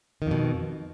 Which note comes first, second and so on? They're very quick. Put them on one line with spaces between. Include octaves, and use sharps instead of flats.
D#3 F2 B2